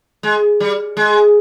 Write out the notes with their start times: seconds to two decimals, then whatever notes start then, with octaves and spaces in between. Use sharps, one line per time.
0.23 G#3
0.60 G3
0.97 G#3